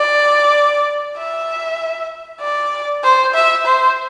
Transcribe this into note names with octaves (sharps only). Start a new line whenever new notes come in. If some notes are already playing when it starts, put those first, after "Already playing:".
Already playing: D5
E5
D5
C5
E5
C5